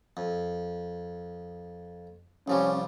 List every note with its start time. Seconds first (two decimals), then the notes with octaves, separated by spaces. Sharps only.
0.17 F2
2.48 C2 F3 G3 C#4